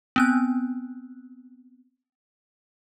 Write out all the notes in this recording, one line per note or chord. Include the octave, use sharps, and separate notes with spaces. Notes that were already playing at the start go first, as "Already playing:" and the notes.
B3 C4 F#6